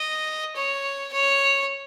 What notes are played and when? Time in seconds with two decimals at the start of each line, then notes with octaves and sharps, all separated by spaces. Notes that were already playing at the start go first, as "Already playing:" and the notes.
Already playing: D#5
0.56 C#5
1.13 C#5